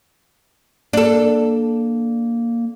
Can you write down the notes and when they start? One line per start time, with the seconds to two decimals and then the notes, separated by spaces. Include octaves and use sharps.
0.93 A#3 D4 A4